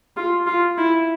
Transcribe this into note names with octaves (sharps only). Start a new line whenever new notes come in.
F4
F4
E4